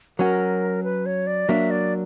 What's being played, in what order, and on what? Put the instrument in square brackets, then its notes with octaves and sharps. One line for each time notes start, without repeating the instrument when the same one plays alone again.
[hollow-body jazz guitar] F#3 C#4 F#4 [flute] A#4
[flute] B4
C#5
D5
[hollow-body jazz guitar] F#3 A#3 D4 [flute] E5
[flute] D5